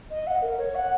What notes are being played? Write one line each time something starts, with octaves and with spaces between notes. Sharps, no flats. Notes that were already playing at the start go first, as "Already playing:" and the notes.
D#5
F#5
A#4
C#5
F#5